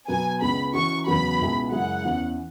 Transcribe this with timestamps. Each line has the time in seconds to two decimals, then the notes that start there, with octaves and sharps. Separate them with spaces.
0.08 B2 F#3 B3 G#5
0.41 C#2 C#3 G#3 B3 G#4 B5
0.73 E3 C#4 F#4 C#6
1.06 E2 C#3 F#3 B3 F#4 B5
1.39 C#2 B2 G#3 E4 G#4
1.72 F#2 C#3 G#3 E4 G#4 F#5
2.04 E2 E3 C#4